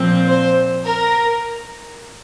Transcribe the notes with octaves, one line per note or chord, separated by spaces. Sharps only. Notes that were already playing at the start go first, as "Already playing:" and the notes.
Already playing: A#2 F3 C4
C5
A#4